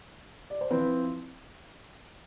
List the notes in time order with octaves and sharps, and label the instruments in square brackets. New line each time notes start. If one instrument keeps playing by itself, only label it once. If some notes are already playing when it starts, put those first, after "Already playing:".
[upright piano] D5
C5
[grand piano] F3 C4 E4 [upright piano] B4